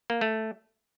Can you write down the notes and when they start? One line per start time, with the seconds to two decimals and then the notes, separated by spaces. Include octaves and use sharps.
0.10 A#3
0.21 A3